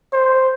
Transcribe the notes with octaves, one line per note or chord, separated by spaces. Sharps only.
C5